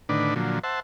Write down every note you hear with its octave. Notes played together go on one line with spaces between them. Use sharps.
A2 D3 D#3 D4 B4
A#2 D3 F3 F#3
C5 E5 F#5 A5